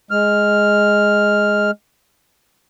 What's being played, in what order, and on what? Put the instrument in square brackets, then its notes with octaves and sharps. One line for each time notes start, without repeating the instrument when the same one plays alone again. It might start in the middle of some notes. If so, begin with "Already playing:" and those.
[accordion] G#3 F6